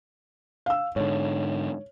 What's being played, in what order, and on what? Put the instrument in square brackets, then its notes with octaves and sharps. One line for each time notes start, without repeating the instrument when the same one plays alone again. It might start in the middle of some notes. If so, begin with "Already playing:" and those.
[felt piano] F5 E6
[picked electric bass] G#2 D3 [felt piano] C#5